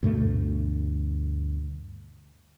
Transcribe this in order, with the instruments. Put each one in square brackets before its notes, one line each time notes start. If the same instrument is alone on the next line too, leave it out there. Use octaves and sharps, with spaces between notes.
[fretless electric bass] D2 G2 B2 A3